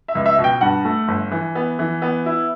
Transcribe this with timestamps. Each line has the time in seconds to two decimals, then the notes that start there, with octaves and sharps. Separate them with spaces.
0.08 E5
0.15 C#2
0.26 E5
0.38 B2
0.44 G5
0.61 G2 F#5
0.85 A3
1.08 G1
1.31 E3
1.55 B3
1.79 E3
2.02 B3
2.26 E4